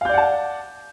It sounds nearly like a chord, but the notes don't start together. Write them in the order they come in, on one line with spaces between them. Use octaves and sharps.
F5 G6 D5 F#5 A5